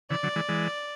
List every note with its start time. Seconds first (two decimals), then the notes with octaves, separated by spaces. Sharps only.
0.10 C#3 E3 D5
0.23 D3 F#3
0.36 E3 G#3
0.49 E3 G#3